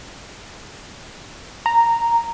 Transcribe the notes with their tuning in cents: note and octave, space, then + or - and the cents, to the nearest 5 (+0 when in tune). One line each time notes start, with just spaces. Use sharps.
A#5 -5